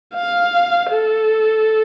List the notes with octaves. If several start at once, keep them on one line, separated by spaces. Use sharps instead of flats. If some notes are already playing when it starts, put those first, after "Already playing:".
F5
A4